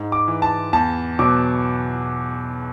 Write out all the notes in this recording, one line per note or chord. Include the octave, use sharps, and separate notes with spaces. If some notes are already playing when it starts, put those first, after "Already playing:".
Already playing: G#2
D6
E3
A5
E2 A5
B2 F#3 D6